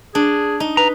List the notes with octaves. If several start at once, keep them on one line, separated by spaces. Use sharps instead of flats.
D4 G#4
D#4
B4 A#5